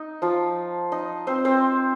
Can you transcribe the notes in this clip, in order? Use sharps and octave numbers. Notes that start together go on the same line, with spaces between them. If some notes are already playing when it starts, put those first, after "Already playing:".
Already playing: D#4
F3 F4
D#4
C4 C5
C4 C5